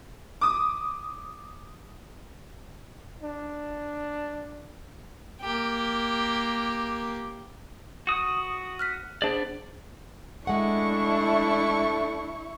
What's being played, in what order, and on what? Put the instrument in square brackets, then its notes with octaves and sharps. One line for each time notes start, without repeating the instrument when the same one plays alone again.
[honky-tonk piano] D6 D#6
[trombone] D4
[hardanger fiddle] A#3 G4
[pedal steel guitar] F#4 D#6
[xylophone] F6 F#6 B6
[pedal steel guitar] B3 D4 D5 [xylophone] G#4 C5 A5
[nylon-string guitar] G#3 F#5 [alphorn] A3 [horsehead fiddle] D4 [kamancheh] E4 C#6